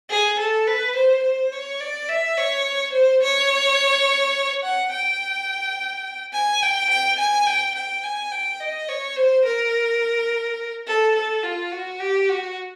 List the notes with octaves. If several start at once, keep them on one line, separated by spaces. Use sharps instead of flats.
G#4
A4
B4
C5
C5
C#5
D5
E5
C#5
C5
C#5
F#5
G5
G#5
G5
G5
G#5
G5
G5
G#5
G5
D#5
C#5
C5
A#4
A4
A4
F4
F#4
G4
F#4